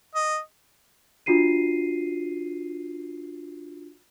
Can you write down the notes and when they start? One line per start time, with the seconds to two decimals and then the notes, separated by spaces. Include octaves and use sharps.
0.15 D#5
1.26 D4 F4 F#4 C7 D#7